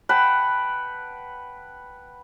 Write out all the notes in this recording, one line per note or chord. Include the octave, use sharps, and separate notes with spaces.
B4 F#5 G5 A5